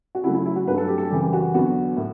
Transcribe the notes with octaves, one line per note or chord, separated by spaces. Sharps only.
F#4
C#3 F#3 A3 E4
E4
E4
F#4
G2 F#3 A3 B4
A4
G4
A4
F#2 C#3 E3 G3 G4
F#4
E2 D3 F#3 B3 F#4
A2